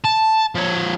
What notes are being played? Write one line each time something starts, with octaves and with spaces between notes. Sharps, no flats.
A5
F3 C#5